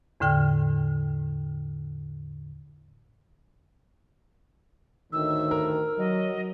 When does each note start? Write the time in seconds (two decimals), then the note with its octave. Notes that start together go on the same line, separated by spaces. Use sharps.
0.20 E2 A2 D3 G5 F6
5.13 D2 A2 D#3 E6
5.51 A#4
5.98 F#3 D#5